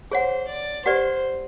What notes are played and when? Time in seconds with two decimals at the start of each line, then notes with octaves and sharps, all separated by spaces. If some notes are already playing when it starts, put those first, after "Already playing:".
0.11 G#4 C5 C#5 F#5
0.49 D5
0.86 G4 B4 C5 D5 F#5